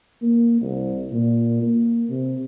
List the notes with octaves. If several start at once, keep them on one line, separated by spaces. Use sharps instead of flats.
A#3
C2
A#2
A#3
C3